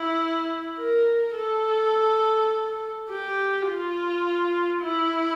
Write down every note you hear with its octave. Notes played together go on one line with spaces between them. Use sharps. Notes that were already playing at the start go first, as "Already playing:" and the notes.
Already playing: E4
A#4
A4
G4
F4
E4